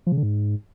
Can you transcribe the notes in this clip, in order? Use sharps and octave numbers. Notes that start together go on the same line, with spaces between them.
F3
C#3
D3
G#2